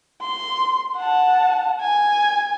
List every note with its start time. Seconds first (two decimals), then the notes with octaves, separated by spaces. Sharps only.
0.21 C6
0.96 F#5 A5
1.81 G#5